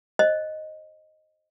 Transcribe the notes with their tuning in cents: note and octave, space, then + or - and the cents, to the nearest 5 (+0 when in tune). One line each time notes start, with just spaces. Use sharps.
C5 +25 D#5 +0